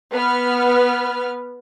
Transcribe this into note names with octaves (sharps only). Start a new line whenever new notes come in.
B3 B4 F6